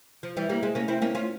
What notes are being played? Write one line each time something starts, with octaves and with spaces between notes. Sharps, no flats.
F3
E3 G3
G3 A#3
G#3 C4
A#3 C#4
C4 E4
A#3 C#4
C#4 F4